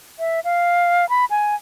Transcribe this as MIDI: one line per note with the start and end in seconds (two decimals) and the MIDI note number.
0.19 0.40 76
0.44 1.09 77
1.09 1.25 83
1.30 1.55 80